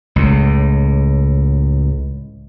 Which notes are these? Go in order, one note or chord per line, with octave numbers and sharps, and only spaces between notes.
C#2 A2